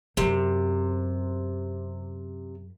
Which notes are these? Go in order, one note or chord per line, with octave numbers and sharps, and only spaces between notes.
F#2 C3